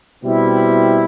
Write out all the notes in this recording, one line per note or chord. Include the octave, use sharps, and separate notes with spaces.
B2 G3 C4 E4